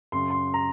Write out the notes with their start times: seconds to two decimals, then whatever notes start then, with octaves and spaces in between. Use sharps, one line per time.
0.12 F#2 C#3 C6
0.30 C6
0.54 A#5